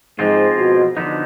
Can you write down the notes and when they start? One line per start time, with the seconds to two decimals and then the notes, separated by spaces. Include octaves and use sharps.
0.19 G#2 F3 G#3 C4 F4
0.58 B2
0.97 D3 F3 B3 D#4